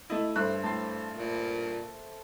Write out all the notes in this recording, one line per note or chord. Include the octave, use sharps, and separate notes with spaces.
A3 E4 D#5
G2 A3 C5 F#6
A2 A5 C6
A#2